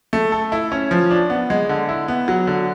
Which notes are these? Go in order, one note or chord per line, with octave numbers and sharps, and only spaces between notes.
A3
A4
E4
C#4
F3
D4
B3
G#3
D3
E4
B3
F#3
D3